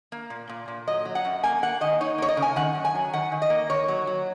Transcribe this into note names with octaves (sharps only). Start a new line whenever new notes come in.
A#3
A#2
A#2
A#2
F#3 D#5
F#3
F#5
F#2
A#3 G#5
A#3 F#5
D#3 D#5
D#4 C#5
A#3 C#5
D#5
C#3
G#5
D#3 F#5
F#2
G#5
F#3
D#3 F#5
D#3
D#5
A#3
D#3 C#5
F#3
F#3